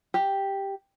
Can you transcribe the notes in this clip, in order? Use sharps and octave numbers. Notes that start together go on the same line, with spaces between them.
G4